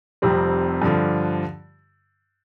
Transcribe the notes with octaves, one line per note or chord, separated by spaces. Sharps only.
F1 F2 C3 G3 C4
G2 D3 F3